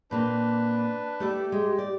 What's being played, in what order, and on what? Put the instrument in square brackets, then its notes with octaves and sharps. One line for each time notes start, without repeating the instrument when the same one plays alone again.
[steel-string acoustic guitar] A#2 A#3 C4 [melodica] D4 B4
[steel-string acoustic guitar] A3 A4 D5 [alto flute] G4
[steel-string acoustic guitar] G#3
D5